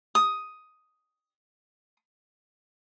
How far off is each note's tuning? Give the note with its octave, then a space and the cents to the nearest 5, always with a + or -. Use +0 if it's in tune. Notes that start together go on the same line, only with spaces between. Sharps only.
D#6 +5